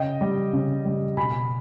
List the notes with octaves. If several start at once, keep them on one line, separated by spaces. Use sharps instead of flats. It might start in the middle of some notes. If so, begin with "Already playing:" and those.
Already playing: C#3 D#5 G5
G3
C#3
G3
B2 G#5 B5